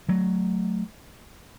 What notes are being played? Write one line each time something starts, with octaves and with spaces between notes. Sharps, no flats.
F#3 A3